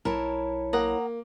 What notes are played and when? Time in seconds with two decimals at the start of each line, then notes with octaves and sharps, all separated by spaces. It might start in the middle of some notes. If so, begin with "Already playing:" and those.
0.05 B1 E4 A#4 C#5 A5
0.73 A#3 F#5 A#5 D#6